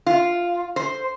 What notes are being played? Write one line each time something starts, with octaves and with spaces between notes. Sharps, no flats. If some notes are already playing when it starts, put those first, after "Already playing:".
F4
C5